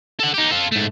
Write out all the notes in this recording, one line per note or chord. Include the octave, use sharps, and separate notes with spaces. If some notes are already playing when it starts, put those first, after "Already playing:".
A4 F#5
D#4 G4
F4 A4
G#2 A3